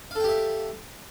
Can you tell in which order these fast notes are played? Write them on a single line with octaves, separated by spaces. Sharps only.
F5 A4 G5 G4 E5